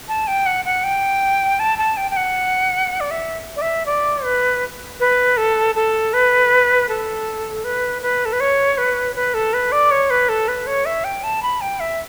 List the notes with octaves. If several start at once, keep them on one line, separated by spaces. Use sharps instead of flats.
A5
G5
F#5
F#5
G5
A5
A5
G5
G5
F#5
D5
E5
D5
E5
D5
B4
B4
A4
A4
B4
A4
B4
B4
A4
B4
C#5
B4
B4
A4
B4
D5
C#5
B4
A4
B4
C#5
E5
G5
A5
B5
G5
E5